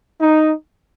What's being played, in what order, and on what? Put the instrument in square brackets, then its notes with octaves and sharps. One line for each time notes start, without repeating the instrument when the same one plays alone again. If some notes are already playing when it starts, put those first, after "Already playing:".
[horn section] D#4